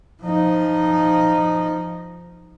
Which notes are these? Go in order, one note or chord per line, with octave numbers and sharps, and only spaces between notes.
F3 D#4